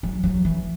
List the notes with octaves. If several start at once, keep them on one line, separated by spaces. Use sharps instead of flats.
F#3
F#3
E3